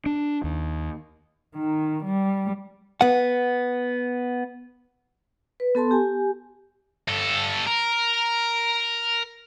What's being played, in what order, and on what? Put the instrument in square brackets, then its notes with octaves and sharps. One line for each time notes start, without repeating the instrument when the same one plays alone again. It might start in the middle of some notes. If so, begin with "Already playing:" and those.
[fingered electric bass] D4
D#2
[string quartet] D#3
G3
[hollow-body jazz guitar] B3 F#5
[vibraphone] B4
B3 A4 A5 C6
G4 G#5
[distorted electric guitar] G2 A4
A#4